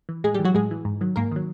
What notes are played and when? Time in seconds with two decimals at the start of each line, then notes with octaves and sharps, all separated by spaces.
0.09 E3
0.24 A2 G#3 G#4
0.34 G3 G4
0.39 E3
0.44 F#3 F#4
0.55 A2 G#3 G#4
0.71 E3
0.85 G#2
1.01 D#3 F#3
1.16 G#2 A#3 A#4
1.31 D#3 F#3